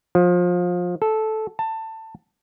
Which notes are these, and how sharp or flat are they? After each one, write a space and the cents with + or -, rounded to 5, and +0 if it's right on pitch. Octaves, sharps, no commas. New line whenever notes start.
F3 +25
A4 -10
A5 +20